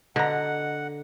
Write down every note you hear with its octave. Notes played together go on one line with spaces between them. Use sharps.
B2 D3 F#5 A#5